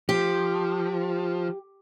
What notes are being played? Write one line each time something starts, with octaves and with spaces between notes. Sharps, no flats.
F3 G4